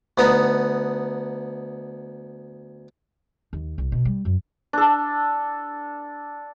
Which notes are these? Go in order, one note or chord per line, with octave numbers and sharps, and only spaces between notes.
D2 B3 D#4
D#2
C2
B2
G3
F#2
D4 A4